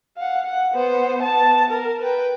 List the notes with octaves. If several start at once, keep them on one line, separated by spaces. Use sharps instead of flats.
F5 F#5
F#5
B3 C5
B3 A5
A#4
B4 G5